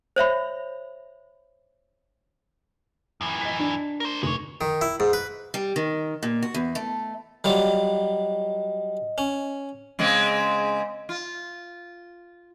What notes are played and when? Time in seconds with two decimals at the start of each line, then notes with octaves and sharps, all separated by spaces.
0.16 C5 C#5 E5 B5
3.21 F#2 E3
3.41 D#5 B6
3.59 D4
4.00 A#4 C5
4.23 F1 G#3 C#5
4.61 D#3
4.81 E4
5.00 G#2
5.13 B4
5.54 G3
5.76 D#3
6.23 A#2
6.43 F#4
6.54 E2
6.75 A3
7.44 F#3 G3 F4 D#5
9.18 C#4
9.99 C#3 G#3 C4
11.09 F4